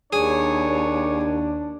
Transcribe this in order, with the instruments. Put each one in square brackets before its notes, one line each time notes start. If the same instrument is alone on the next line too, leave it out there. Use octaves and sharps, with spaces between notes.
[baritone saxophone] D#2 [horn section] D4 [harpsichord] G#4 [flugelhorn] C#5